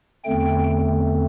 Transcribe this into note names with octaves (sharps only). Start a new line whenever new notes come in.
E2 D3 A3 C4 G5